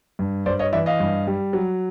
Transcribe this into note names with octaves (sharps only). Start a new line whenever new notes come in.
G2
G2 C5 D5
C#5 D#5
E3 D5 E5
D#5 F5
G2
G3
F#3